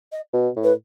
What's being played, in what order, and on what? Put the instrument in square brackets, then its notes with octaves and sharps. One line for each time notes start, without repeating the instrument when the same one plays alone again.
[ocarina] D#5
[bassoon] B2
A2
[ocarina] B4